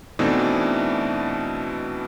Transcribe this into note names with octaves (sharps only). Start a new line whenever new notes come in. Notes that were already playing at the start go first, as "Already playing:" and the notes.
B2 E3 A3 C4 D4 D#4